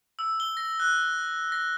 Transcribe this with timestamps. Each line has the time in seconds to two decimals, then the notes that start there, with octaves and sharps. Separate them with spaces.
0.19 E6
0.40 G7
0.57 A#6
0.80 F#6
1.52 A#6